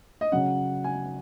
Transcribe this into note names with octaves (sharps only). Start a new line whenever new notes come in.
D#5
C#3 F#3 C#4 F#5
G#5